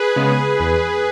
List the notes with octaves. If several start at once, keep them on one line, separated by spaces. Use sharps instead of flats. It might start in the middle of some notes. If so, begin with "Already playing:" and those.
Already playing: G#4 B4
C#3 G#3 B3
E2